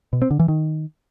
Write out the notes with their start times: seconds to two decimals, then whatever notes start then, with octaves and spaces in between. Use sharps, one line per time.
0.13 B2
0.22 C4
0.31 D3
0.40 E3
0.48 D#3